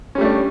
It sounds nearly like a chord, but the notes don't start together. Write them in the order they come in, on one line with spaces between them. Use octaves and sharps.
C#4 G3 A3 D4